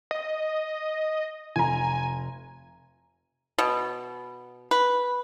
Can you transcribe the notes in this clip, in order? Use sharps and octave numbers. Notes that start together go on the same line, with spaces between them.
D#5
F1 G#5 A#5
B2
B4